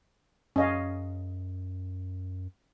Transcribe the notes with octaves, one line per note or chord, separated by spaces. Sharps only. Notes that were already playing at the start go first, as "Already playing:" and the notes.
F#2 C#4 D#5 F5